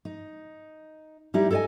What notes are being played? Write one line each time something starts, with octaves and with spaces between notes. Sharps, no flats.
D#4
G3 D#4 E4 G4
A4 C5 C#5 D#5 G#5